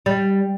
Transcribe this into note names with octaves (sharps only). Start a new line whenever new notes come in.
G3